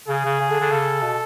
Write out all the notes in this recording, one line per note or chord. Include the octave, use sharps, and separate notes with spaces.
C#3 G#4
C#3
C#3
D3
D3
C#3 A4
B2